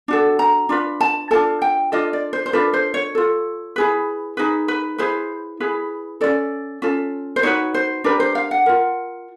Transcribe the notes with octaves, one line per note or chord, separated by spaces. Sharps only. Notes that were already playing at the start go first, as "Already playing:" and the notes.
D4 F#4 A4
A#5
D4 F4 B4
A5
D4 F4 A4 A5
G5
D4 F4 A4 D#5
D5
C5
C5
D4 F4 A4 B4
C5
C#5
F4 A4
E4 G#4 B4
D#4 G#4 B4
B4
E4 G#4 B4 C5
E4 G#4 B4
C#4 F4 A4 D5
C#4 F4 A4
C5
D#4 F#4 B4 C#5
C5
D4 G4 A#4 B4
C5
F5
F#5
F4 A#4